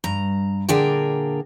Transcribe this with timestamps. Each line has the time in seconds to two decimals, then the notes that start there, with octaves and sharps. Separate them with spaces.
0.04 G2 A#5
0.68 A#2 D3 D4 G#4 A#4 G5